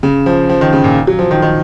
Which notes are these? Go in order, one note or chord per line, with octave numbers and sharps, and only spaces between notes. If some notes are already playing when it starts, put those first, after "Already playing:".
C#3
F3
F3
D#3
C#3
A#2
F#3
F3
D#3
D#3